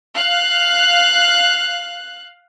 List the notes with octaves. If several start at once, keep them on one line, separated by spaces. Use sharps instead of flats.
F5 F#6